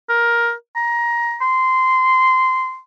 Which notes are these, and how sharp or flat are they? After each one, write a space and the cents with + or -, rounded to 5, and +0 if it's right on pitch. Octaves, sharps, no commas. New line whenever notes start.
A#4 +10
A#5 +20
C6 -15